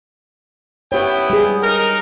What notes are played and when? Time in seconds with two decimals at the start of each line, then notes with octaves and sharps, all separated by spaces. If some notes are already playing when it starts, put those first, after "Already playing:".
0.92 B3 E4 G4 C#5 G5
1.30 G3 G#4
1.63 D#4 A#4